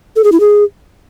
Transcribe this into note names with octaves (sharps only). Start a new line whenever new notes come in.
A4
G#4
E4
G#4